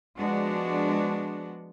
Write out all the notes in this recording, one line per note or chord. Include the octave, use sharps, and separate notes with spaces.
F3 G#3 B3 D4 F#4